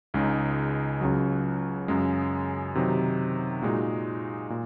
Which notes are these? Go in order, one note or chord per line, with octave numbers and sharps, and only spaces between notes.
C#2 C#3 G#3 D#4
C#2 C#3 F#3
F#2 C#3 G#3
C3 D#3 F#3 C4 D#4
A#2 G#3 D#4 F#4
A#2